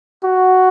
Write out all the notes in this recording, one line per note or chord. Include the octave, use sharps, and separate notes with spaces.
F#4